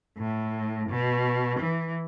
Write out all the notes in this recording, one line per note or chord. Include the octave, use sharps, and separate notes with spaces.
A2
B2
E3